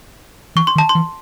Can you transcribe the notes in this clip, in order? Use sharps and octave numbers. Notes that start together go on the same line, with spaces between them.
E3 C#6
C6
D#3
A5
C6
E3